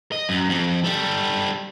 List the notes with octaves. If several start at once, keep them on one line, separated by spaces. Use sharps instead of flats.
D#5
F#2
F2
G3 A4